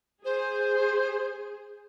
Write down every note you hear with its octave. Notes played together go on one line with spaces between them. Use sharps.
G#4 C5